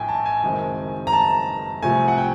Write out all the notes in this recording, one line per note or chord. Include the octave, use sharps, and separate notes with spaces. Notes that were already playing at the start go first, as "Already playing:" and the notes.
Already playing: A#1 A2 G5 G#5
A5
G#5
F#1 F#2 D#3 G#3 C4
A#5
A5
C2 C3 F3 A3 G#5
F#5
G5